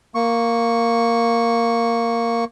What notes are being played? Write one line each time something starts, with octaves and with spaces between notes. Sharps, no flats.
A#3 C#6